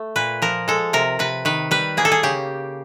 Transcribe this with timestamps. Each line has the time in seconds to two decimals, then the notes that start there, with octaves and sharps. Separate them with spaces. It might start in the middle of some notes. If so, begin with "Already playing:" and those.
Already playing: A3
0.16 A#2 B4
0.42 F3 A#4
0.68 G#3 A4
0.93 C3 A#4
1.19 C3 B4
1.45 D#3 B4
1.71 G3 B4
1.97 A#3 G#4
2.05 A4
2.12 G#4
2.23 C#3 G4